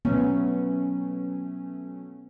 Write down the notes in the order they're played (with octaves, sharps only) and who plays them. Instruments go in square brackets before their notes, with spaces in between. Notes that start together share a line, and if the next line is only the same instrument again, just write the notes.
[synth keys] F#3 A3 C#4 [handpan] B3